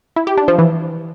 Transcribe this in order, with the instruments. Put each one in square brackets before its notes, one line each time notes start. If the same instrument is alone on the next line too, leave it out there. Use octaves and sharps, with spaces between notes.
[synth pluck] E4
G4
D4
F3
E3